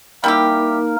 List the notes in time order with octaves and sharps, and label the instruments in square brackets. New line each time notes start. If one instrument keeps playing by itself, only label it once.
[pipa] G3 E4 G4 [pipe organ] A#3 D#4 A#4